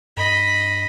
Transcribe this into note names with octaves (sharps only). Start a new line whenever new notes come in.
G2 D#5 B5